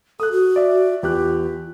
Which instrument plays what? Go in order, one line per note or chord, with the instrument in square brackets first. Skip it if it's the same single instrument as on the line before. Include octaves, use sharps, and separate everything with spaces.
[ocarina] A4 [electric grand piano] D#6 F#6
[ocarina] F#4
[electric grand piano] D5 E5
[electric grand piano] E2 G4 F#6 [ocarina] F4